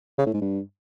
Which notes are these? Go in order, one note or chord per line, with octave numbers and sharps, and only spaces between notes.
C#3
A2
G#2
G2